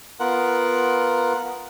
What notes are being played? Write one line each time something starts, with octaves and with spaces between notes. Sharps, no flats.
B3 F4 A#4 F#5